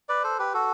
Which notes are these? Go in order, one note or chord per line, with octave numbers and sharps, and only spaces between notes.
B4 D5
A4 C5
G4 B4
F#4 A4